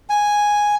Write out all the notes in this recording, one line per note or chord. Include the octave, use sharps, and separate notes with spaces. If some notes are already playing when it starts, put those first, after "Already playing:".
G#5